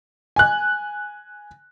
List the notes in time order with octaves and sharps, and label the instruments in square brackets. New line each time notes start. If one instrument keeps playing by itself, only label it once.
[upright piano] G#5 F#6